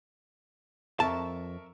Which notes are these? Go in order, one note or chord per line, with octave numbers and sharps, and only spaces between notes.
F2 A#4 E5 A5 C#6